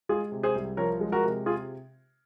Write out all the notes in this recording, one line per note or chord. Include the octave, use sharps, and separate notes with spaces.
G#3 F4 G#4
C3
G#4 C5
C2
F3 A#4 C#5
G#3
F#4 A#4
C3
F4 G#4